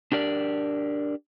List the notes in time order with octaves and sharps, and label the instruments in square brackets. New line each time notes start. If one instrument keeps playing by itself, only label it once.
[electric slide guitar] D4 G4 A#4 D5